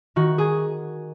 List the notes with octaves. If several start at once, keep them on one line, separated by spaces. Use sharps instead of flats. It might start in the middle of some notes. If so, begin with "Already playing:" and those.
D#3 F#4
G#4